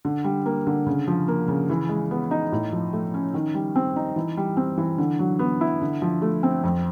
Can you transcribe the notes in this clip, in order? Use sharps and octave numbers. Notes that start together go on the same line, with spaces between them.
D3
G3
A#3
D3
C#3
F3
A#3
C#3
E3
G#3
B3
D#4
A2
F3
A3
C#4
D#3
G3
C4
D#4
E3
G3
C4
E3
D3
F#3
B3
E4
D3
F3
A3
C4
F2